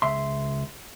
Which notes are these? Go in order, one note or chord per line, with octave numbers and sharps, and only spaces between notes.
C#2 E5 C6